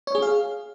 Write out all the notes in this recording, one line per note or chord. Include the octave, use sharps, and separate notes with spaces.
C#5
G#4
F5